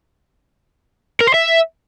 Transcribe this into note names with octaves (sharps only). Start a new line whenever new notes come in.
A#4
C5
E5